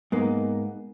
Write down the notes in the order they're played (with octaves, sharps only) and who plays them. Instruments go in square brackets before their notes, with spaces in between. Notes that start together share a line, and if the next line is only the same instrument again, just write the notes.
[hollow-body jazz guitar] G#2 A#3 [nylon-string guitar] B3 D#4